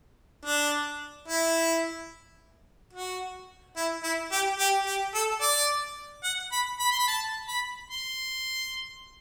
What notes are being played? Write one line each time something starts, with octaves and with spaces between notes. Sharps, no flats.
D4
E4
F#4
E4
E4
G4
G4
G4
A4
D5
F#5
B5
B5
C6
B5
A5
B5
C6